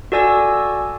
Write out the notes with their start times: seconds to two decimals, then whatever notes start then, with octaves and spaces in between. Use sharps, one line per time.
0.12 F#4 A4 D5 G#5 E6